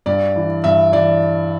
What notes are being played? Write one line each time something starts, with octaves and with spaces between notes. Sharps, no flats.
G2 D5
E3
G2 E5
E3 D5